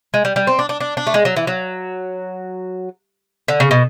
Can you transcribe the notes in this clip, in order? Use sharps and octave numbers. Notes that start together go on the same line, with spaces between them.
G#3
G3
G3
C4
D4
D4
D4
D4
A3
G#3
F#3
E3
F#3
D3
C#3
B2